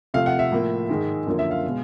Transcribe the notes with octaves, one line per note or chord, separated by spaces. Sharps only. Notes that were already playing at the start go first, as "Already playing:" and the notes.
C3 F3 A3 F5
F#5
E5
A2 F3 A#3
G#2 D#3 G#3
F#2 D3 F3 A#3
E5
F5
B2 G#3